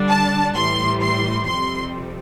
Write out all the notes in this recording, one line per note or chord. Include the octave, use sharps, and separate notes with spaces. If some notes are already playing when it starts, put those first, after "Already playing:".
Already playing: D3 G3 D4
A5
A2 E3 G3 C6
C6
F2 C3 G3 C4 C6